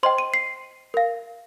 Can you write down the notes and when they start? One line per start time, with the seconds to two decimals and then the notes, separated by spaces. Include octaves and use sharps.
0.03 C5 D#5 G5 C6
0.18 D#7
0.34 C7
0.94 A#4 F5